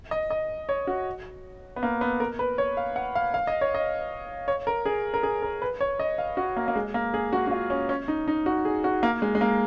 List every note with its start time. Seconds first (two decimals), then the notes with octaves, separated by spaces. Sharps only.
0.11 D#5
0.31 D#5
0.69 C#5
0.87 F#4
1.76 B3
1.83 A#3
2.01 B3
2.20 A#4
2.39 B4
2.58 C#5
2.77 F5
2.96 F#5
3.15 F5
3.34 F5
3.47 D#5
3.61 C#5
3.75 D#5
4.48 C#5
4.67 A#4
4.86 G#4
5.14 A#4
5.23 G#4
5.42 A#4
5.62 B4
5.81 C#5
6.00 D#5
6.18 F5
6.37 F#4
6.57 A#3
6.68 A#3
6.75 G#3
6.94 A#3
7.14 G#4
7.33 F#4
7.47 F#4
7.51 F4
7.70 C#4
7.89 C#4
8.08 D#4
8.28 D#4
8.46 F#4
8.65 G#4
8.84 F#4
9.03 A#3
9.22 G#3
9.35 G#3
9.41 A#3